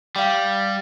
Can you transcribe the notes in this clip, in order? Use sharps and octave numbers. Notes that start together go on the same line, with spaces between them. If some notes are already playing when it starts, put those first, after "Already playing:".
G3 F5 G5